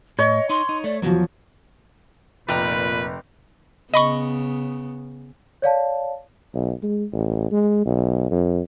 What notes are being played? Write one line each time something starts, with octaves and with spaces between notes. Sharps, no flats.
A2 C#5 D#5
D#4 C6
D#4
A3 D5
E2 F3 F#3 F#4
F1 A#2 G4 A#4 B4 D5
C#3 B3 D#5 B5 C#6
C#5 D5 F5 A5
B1
G#3
A1
G#3
B1
F2